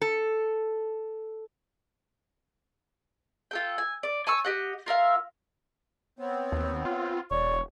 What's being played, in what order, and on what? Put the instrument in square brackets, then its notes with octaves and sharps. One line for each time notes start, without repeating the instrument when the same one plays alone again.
[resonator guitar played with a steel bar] A4
[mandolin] F4 A4 G5
G#5
D5
G#5 A5 C#6 E6
G4 D#5 F#5
F4 A#4 E5 F5
[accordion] B3 C4 [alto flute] C#5
[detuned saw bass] D#2
F4
[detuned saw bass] E1 [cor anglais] C#5 [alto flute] D5